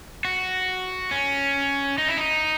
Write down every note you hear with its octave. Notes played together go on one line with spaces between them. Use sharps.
F#4
C#4
D#4
E4
D#4